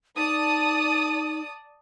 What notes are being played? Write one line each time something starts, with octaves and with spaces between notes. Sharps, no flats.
D#4 D5 A5 D#6